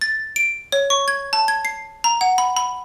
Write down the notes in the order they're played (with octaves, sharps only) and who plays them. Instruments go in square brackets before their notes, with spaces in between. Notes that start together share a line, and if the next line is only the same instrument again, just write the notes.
[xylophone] A6
D7
C#5
C#6
G#6
A5
G#6
C7
A#5
F#5
B5
B5